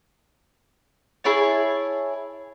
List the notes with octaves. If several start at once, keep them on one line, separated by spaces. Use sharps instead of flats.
E4 G#4 C#5 A5